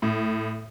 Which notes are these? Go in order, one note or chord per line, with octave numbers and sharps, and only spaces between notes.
A2